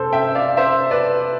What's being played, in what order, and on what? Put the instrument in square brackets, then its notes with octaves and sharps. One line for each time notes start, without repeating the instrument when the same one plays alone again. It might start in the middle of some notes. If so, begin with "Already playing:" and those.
Already playing: [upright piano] F1 A4 C5
E5 G5
D5 F5
C5 E5
B4 D5